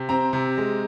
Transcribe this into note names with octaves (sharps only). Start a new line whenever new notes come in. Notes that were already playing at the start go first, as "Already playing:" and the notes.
Already playing: C3
C4 A#5
C3
G#3